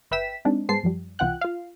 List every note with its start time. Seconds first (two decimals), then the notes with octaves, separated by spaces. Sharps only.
0.11 G1 B4 E5 G5 B6 E7
0.45 G#3 C4 D4 D#4
0.69 G#2 B3 G#4 C5 A5 C7
0.83 F#2 F3 G3
1.19 C2 E3 F4 F#5 G5 F#6
1.41 F4 F5